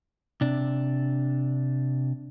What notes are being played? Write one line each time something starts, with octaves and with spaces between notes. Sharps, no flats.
C3 D4